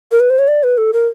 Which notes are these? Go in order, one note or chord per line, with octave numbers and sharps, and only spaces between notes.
A#4
B4
C5
C#5
D5
B4
A4
A#4